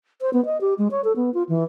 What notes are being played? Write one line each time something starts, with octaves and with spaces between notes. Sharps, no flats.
C5
B3
D#5
G4
G#3
C#5
A4
B3
F4
E3